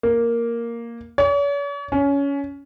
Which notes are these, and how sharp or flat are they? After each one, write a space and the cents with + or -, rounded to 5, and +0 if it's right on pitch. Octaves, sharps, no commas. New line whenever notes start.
A#3 +0
C#5 +45
C#4 +20